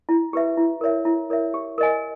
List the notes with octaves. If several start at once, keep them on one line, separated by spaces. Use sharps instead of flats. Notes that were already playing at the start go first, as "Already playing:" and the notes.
E4
G4 B4 E5
E4
A#4 C#5 E5
E4
A#4 C#5 E5
G4
A#4 D#5 G#5